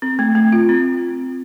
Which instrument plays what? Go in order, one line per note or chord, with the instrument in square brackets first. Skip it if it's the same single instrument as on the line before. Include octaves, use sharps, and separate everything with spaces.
[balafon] C4
A3
A3
F4
C4